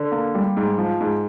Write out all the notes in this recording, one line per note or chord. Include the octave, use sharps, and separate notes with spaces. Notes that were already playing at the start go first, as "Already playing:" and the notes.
Already playing: D3
A#3
G3
G#2
F3
G#2